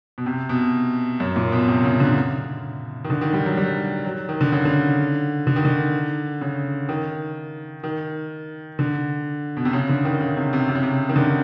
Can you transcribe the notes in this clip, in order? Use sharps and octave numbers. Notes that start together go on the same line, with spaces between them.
B2
C3
B2
F#2
A#2
B2
C3
C#3
D3
D#3
D3
D#3
G3
F#3
G3
F#3
D#3
D3
C#3
D3
D3
D#3
D3
C#3
D#3
D#3
D3
B2
C3
C#3
D3
D#3
C#3
C3
C3
C3
C#3
C3
D#3
D3